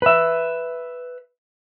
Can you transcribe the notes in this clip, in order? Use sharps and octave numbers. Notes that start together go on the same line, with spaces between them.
B4 E5